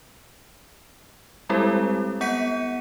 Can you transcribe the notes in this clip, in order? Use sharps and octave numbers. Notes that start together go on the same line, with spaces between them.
G3 G#3 C4 E4 G4 A4
B3 F#5 G6 B6 C#7 D#7